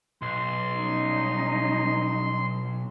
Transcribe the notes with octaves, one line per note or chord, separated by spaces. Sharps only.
B1 C6
G3 C#4 D#4
F#3